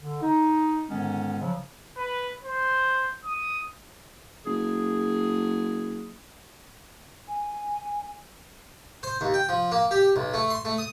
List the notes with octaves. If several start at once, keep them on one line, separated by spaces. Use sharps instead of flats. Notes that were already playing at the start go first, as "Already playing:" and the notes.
D3
D#4
G#2 D3 D#3 G#3 B3 C#4
C#3 F3 F#3
B4
C5
D#6
F#1 G#4
G#5
C5
D#2
G5
F3
A#3
G4
B1
A3
C6
A3
D#6